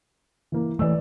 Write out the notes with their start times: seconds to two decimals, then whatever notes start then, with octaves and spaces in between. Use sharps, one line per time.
0.52 E3 A#3
0.79 E3 A3 B4 D5 E6